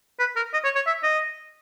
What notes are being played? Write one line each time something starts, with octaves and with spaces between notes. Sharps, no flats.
B4
A#4
D#5
C#5
C#5
E5
D#5